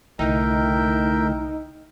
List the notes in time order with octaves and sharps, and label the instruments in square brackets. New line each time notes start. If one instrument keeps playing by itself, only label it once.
[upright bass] C2 [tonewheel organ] D3 A3 E4 [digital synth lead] D#4 [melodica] A#4 E5 G5